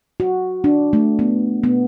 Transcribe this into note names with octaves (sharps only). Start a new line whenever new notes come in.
F#4
D4
A3
B3
B3